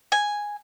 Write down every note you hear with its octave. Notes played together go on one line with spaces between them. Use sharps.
G#5